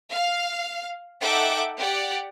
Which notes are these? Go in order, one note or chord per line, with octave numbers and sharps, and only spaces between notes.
F5
D#4 A4 E5 F#5 G5 D6
G4 D5 F#5